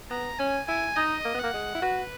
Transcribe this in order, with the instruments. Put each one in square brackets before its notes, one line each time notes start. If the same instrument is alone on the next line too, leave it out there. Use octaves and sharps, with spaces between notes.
[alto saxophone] B3 [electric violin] A#5
[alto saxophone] C#4 [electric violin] G#5
[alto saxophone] E4 [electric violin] G#5
[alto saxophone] D#4 [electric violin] D#5
[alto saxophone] A#3
B3
[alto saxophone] A#3 [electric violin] F#5
[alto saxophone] G#3
E4
[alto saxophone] F#4 [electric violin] B4